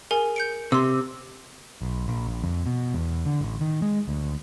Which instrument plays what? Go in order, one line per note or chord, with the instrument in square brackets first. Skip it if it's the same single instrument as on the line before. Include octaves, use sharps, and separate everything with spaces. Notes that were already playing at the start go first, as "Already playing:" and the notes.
[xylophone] G#4 A#4 G#5
G6 C#7 D7
[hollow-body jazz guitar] C3 [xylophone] C6 E6
[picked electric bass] B1
A#1
A#1
F2
B2
E2
D3
A1
D#3
G#3
D2